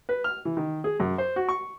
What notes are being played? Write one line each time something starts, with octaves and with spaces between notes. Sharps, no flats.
B4
F6
E3
D#3
G#4
F#2
C5
F#4
C#6